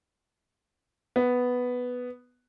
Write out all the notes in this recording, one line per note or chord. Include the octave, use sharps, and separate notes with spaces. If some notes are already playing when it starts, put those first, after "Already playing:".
B3